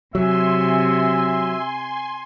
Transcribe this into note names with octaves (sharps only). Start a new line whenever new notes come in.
C3 F#3 E5 G#5 C6